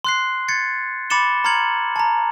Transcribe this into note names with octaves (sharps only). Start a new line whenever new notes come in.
C6 F#6 C7
G#6 A6 C#7
B5 D6 A6 C#7 E7 G7
A#5 C6 F6 G#6 C#7 F#7
A5 A#5